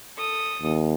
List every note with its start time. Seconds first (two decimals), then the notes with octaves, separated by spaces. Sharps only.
0.17 A4 D#6
0.62 D#2